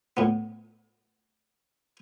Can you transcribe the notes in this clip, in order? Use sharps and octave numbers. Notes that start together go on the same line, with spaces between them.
A2 B3